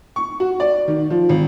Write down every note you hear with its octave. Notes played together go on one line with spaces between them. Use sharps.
C#6
F#4
D5
D#3
F3
G#1